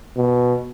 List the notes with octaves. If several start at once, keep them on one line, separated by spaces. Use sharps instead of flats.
B2